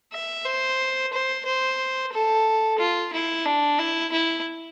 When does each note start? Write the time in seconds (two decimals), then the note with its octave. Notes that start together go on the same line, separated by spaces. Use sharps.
0.13 E5
0.46 C5
1.13 C5
1.45 C5
2.13 A4
2.79 F4
3.13 E4
3.46 D4
3.79 E4
4.12 E4